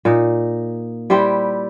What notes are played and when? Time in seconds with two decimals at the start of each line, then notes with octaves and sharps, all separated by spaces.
0.05 A#2 D#4
1.10 G3 E4 G4 C5